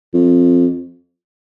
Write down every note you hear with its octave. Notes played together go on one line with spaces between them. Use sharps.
F2